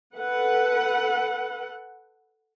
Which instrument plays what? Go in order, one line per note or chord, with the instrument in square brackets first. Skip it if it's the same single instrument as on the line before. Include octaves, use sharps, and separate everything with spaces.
[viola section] A4 B4 F#5